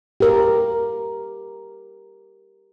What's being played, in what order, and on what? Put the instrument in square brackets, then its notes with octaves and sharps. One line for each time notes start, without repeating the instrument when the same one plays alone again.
[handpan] G4 A#4